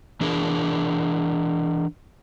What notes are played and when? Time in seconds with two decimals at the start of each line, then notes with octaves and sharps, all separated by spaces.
0.21 E3 D4 G#4 A#4